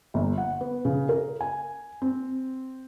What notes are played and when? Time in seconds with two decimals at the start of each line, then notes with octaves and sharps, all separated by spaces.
0.14 G1
0.38 F#5
0.61 B3
0.85 C#3
1.09 A#4
1.41 G#5
2.02 C4